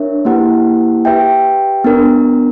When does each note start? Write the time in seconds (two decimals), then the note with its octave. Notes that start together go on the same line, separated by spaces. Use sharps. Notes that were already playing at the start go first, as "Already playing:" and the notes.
Already playing: D4 A#4 C#5 E5
0.25 A#3 E4 G4 B4 F#5
1.05 G4 B4 E5 G5
1.84 B3 D4 A#4